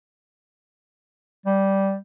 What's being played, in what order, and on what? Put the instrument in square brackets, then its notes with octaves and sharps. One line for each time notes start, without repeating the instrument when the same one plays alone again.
[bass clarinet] G3